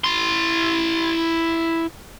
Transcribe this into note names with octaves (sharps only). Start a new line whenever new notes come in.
E4 C6